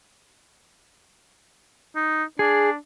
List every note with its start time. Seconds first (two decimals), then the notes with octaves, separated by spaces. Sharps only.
1.96 D#4
2.39 D4 G#4